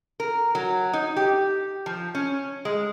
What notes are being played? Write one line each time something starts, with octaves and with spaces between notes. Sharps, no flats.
A#4
F#3
D#4
G4
F3
C#4
G#3